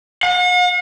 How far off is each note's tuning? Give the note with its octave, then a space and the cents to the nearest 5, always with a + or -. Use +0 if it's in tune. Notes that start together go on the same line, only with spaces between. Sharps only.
F#5 -45